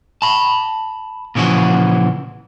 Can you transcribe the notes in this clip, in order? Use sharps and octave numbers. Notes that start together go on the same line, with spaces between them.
A5 B5
A#2 C#3 E3 F3 F#4